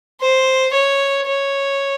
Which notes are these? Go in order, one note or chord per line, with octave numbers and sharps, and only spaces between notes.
C5
C#5
C#5